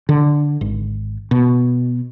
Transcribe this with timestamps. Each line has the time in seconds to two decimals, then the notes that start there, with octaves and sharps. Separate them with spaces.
0.09 D3
0.61 G#1
1.31 B2